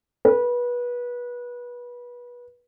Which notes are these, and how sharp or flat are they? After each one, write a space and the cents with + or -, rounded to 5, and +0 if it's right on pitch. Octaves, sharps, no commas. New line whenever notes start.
B4 -25